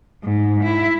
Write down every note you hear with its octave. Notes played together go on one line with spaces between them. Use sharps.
G#2
E4